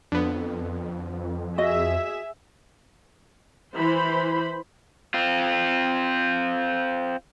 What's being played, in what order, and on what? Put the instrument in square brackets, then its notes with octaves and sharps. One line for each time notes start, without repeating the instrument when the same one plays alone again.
[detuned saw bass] F2 [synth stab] D3 B3
[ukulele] F#4 D#5 [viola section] G#4 E5
[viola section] E3 C5 B5
[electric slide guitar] C4 F4